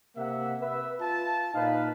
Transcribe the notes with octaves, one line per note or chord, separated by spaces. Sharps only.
C3 A#3 E5 F#5
B4 E5
F4 A5
A#2 D#4 B4 F5